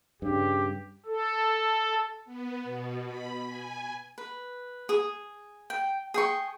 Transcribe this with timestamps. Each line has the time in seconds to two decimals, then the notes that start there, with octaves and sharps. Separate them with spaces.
0.22 G2 C#3 G4
1.06 A4
2.25 B3
2.64 B2
3.06 B5
3.44 G#5
4.18 B4
4.89 G#4
5.70 G5
6.14 G#4 G5 C#6